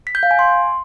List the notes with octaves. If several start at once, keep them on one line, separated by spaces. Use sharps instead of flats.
B6
G6
F5
G#5
C6